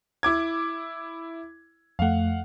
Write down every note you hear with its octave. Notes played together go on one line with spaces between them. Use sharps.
E4 D6 G#6
F2 A3 F5 F#5